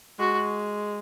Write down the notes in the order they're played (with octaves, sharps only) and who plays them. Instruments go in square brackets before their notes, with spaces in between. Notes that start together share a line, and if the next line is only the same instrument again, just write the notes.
[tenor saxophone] G#3 [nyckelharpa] F#4